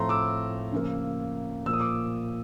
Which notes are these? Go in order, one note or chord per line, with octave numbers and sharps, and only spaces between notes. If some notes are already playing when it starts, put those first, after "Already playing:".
Already playing: A2 F3 A3 C4 A#5 C6
D6 E6
C#3 F3 A#3
A#2 F3 A#3 E6
D#6
D6